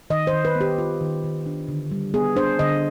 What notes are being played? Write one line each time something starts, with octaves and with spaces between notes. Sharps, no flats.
D#3 D#5
C5
D#3
B4
B3
G4
F4
D#3
D#3
D4
D3
G3
B3 G#4
D4 C5
D3 D#5